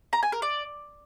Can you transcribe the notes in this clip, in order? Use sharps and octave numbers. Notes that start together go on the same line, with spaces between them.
A#5
G#5
A#4
D5